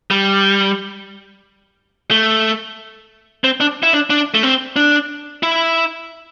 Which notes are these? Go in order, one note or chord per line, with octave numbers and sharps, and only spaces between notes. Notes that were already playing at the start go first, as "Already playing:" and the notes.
G3
A3
C4
D4
E4
D4
D4
A3
C4
D4
E4